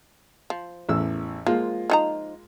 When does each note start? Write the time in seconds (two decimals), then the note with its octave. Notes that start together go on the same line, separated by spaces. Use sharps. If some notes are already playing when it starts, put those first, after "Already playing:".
0.50 F3
0.89 A1 E2 E6
1.47 F3 G#3 A#3 F4
1.90 F3 D#4 A#5